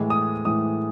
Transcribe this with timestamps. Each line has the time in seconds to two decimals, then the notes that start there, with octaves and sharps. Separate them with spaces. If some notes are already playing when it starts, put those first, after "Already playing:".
Already playing: A2 E3 G#3
0.10 D#6
0.45 A2 E3 G#3 D#6